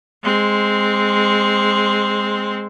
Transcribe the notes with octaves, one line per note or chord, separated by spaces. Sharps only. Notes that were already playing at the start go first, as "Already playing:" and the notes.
G#3 C4